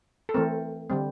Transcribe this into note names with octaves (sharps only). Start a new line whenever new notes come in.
A4
E3 A3 C4 A#4
D3 G3 C4